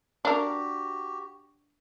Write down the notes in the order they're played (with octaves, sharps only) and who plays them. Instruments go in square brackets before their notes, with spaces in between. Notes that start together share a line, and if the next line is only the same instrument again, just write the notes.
[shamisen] D4 A#4 [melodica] F#4 G4